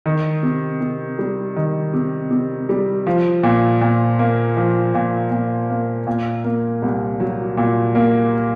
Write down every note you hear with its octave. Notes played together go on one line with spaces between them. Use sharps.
D#3
C3
C3
G3
D#3
C3
C3
G3
F3
A#2
A#2
A#3
F3
A#2
A#2
A#3
A#2
A#3
C2
F#3
A#2
A#3